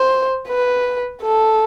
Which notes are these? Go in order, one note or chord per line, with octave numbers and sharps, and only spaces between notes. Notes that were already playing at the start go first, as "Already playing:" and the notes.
Already playing: C5
B4
A4